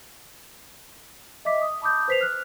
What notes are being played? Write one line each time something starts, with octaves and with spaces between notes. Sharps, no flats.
D#5 E5 D6 B6
D#6
A5 B5 D6 D#6 G6
B4 C5 B6 C7 F7
F6 F#6